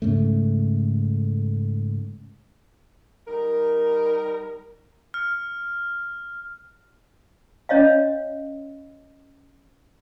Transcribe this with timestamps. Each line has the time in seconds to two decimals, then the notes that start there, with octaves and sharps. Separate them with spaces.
0.02 G#2 C#3 A3
3.27 G3 D#4 A#4
5.14 F6
7.69 C#4 C#5 D#5 F5